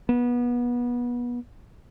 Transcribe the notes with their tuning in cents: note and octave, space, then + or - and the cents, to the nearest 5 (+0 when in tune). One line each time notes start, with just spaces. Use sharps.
B3 -25